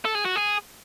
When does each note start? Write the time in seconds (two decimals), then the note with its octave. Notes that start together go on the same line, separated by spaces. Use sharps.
0.05 A4
0.15 G#4
0.25 F#4
0.36 G#4